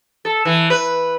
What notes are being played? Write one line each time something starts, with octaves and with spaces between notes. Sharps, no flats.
A4
E3
B4